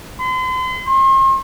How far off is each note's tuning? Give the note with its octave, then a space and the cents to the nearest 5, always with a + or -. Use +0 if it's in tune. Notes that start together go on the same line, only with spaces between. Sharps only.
C6 -40
C6 +45